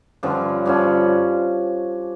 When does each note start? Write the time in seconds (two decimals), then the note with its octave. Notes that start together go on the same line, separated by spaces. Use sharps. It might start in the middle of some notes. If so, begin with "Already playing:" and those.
0.23 G2 D3 F3 C#4
0.65 G2 D3 F3 C#4